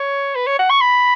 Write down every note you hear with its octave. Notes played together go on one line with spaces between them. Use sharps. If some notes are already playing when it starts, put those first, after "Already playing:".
Already playing: C#5
B4
C#5
F#5
C#6
B5